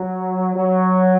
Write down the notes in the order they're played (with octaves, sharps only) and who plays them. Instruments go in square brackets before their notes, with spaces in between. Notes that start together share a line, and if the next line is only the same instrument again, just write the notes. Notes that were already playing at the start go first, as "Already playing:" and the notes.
Already playing: [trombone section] F#3
F#3